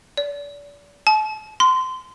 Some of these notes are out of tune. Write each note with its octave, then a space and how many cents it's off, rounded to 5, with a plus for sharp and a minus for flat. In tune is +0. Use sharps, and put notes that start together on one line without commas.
D5 -35
A5 -35
C6 -20